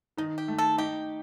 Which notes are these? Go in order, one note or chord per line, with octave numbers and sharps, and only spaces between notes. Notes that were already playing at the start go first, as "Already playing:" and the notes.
D#3 D#4
G4
A3
A4
D#4 G4